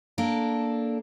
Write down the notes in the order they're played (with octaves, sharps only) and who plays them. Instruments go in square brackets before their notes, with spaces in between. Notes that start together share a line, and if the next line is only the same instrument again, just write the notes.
[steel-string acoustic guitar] A#3 D4 A4